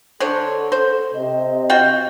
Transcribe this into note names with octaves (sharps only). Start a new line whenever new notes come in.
D3 A4 C5 C#5
C5
C3 D#5
F4 F#4 G5